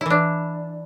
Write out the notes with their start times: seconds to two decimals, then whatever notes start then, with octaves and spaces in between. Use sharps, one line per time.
0.01 E4
0.06 E3
0.10 D4